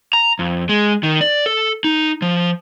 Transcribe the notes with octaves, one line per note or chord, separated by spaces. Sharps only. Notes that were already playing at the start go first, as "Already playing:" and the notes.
A#5
F2
G#3
D#3
D5
A4
D#4
F3